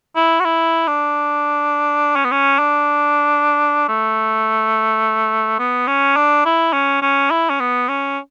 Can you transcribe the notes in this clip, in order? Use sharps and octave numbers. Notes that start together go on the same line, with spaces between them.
E4
F#4
E4
D4
C#4
B3
C#4
D4
A3
B3
C#4
D4
E4
C#4
C#4
E4
C#4
B3
C#4